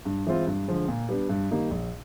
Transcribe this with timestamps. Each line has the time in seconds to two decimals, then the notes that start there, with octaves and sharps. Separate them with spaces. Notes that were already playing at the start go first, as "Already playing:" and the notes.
0.05 G2
0.26 E3 G#3 C4 F4
0.47 G2
0.68 D3 F3 G#3
0.88 A#2
1.09 G3 B3 D4
1.29 G2
1.51 D#3 G3 A#3 D#4
1.71 A#1